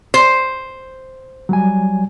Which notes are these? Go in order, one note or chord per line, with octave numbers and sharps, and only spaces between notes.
C5
F#3 G3 G#5